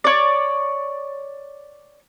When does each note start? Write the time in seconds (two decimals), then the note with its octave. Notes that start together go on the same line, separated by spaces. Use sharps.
0.04 C#5 D5